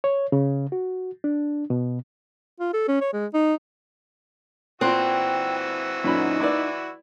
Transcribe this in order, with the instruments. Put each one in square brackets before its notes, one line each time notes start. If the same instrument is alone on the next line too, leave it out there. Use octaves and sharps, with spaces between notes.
[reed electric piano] C#5
C#3
F#4
D4
B2
[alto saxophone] F4
A4
C#4
C#5
G#3
D#4
[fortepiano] A#2 C6 F#6 [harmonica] E3 F#4 E6 [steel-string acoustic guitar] C4 [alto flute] G5
[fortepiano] F#2 A#2 B5 [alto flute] D#4
[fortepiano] E4 B4 D5